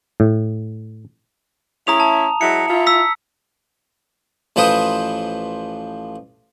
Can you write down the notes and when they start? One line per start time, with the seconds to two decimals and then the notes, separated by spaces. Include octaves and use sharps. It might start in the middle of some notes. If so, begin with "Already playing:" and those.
0.20 A2
1.87 A3 C#4 E4 A#5 D#6 F7
2.00 A5
2.41 F#3 G#3 E4 C#7
2.68 E4 F4
2.87 E6 B6
4.56 A1 F3 B4 C5 D#6